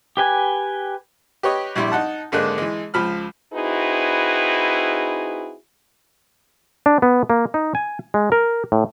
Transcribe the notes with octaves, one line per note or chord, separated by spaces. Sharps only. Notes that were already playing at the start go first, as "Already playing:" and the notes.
G4 B4 G#5
G4 B4 C#5 D#5
A#1 G3 E4 C6
D#4 F#5 A5
G#1 D3 G#3 A#3 D4 F#6
E3 G#3
C#2 F3 B5 F6
C4 D#4 E4 F#4 G#4 B4
D4
B3
A#3
D#4
G#5
G#3
A#4
A2